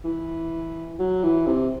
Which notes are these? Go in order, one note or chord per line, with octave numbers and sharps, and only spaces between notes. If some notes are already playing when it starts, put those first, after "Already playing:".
E3
F#3
E3
C3